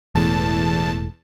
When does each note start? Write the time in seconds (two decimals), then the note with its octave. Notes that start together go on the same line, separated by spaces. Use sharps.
0.15 E1 E2 A2 A5